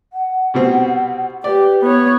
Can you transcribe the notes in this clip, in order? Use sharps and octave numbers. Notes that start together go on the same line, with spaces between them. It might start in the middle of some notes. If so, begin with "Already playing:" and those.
F#5
C2 B2 C4
G4 B4 D5
B3 E4 C#5